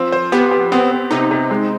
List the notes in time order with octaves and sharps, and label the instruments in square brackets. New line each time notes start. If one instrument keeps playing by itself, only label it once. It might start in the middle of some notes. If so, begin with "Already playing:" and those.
Already playing: [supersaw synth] F3 [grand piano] C4 F4
[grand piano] C5
[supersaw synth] B3 [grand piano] G4
[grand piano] G4
[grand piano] B3 [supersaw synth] C4
[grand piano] B3
[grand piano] C3 [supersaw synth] D#4
[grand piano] C3
G#3